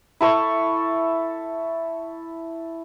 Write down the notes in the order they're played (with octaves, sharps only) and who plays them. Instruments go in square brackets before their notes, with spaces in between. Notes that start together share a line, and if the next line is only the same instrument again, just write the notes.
[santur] E4 A4 C#6